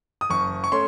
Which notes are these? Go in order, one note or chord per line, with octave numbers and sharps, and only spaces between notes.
D#6
F#1 C#6
C#6
A3 C#4 C6